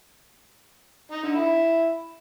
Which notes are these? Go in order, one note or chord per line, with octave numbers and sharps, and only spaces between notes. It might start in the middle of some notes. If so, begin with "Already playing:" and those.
D#4
D3
E4